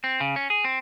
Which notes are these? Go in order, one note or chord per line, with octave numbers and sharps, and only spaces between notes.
C4
C#3
C#4
G#4
C4